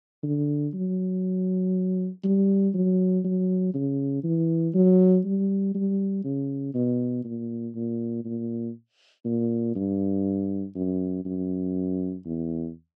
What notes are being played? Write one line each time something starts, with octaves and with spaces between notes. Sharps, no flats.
D3
F#3
G3
F#3
F#3
C#3
E3
F#3
G3
G3
C#3
B2
A#2
A#2
A#2
A#2
G2
F#2
F#2
E2